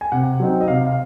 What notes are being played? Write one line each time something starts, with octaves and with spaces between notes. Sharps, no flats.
G#5
C3 F#5
F#3 C4 D#4
D#5
C3 F5
F5